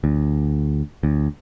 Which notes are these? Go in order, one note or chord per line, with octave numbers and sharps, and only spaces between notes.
D2
D2